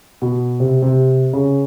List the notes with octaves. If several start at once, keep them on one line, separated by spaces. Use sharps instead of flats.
B2
C3
C3
C#3